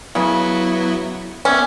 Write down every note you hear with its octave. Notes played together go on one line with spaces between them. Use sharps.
C#3 F#3 B3 E4
B3 C#4 D5 E5